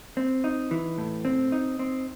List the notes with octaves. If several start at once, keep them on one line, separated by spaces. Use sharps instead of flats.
C4
D#4
E3
A2
C4
D#4
C4